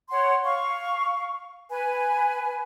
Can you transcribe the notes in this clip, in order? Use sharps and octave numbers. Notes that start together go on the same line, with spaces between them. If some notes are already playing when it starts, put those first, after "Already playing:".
C#5 F#5 C6
F5 C#6
B4 G#5